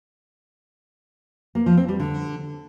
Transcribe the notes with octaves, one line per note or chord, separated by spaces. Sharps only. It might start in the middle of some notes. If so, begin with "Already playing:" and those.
A#3
F3
C4
G3
D3